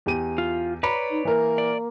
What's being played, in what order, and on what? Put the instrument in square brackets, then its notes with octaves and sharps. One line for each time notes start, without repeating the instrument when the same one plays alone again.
[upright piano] E2 G4 D#7
[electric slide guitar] F4
[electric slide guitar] B4 C#5 D5 [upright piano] A#5 B5
[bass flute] D#4
[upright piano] E3 A#4 [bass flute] A#3
[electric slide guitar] D5